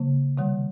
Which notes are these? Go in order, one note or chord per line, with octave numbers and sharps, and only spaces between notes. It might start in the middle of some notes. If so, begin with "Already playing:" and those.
Already playing: C#3 F#3 A#3
C3 D#3 G3